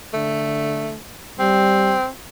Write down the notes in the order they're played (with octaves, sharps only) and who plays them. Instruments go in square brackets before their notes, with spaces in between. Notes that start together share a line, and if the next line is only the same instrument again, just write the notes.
[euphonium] D3 [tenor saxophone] A3
[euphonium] G3 [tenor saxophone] C4